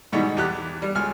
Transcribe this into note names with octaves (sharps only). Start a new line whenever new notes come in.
G#2 B2 D#3 E3 G3
E2 G4 F#6
G3
C#2 G#5 F6